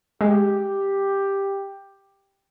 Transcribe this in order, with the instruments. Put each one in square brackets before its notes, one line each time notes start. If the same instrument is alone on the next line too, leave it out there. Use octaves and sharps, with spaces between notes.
[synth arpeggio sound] G#3 [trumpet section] G4